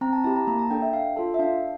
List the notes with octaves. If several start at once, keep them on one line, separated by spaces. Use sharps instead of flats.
C4 A#5
A5
E4 G4 A5
A#5
A#3 A#5
A5
D4 A4 G5
E5
D4 F5
F4 A4 A5
E5
D4 F5